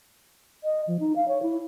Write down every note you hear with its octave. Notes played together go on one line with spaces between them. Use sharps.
D#5
F3
D#4
F5
C#5
E4